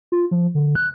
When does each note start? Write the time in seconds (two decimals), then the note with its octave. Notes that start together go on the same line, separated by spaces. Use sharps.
0.12 F4
0.31 F3
0.55 D3
0.75 F#6